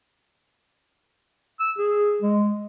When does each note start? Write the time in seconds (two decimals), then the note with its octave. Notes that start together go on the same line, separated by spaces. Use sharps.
1.60 E6
1.78 G#4
2.22 G#3